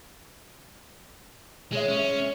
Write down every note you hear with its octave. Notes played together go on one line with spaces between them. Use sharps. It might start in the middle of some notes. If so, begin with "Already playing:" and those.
G#3 G#4 C#5 E5
C#4